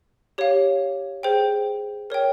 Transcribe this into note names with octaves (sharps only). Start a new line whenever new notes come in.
G4 C#5 F5
G#4 C5 G5
A#4 C#5 G5